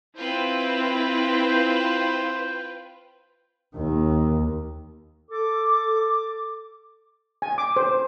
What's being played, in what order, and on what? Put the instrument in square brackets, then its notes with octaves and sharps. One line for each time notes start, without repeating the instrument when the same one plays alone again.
[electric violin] C4 E4 [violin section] F4 B4 G5 [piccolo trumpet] C5
[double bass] D#2 D#3
[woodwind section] A4 D6
[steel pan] G#5
D6
C5